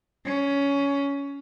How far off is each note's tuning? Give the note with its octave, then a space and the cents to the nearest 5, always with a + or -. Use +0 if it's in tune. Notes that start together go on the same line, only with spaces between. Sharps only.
C#4 +15